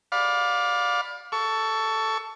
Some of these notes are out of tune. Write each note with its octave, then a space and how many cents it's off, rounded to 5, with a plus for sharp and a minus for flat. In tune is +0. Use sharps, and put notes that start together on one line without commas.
D5 -5 F5 +30 B5 +0
A4 +5 C#6 +20